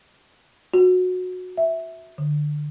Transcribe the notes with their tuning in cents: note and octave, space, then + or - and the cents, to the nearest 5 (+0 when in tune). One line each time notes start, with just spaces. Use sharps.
F#4 -20
E5 -5
D3 +20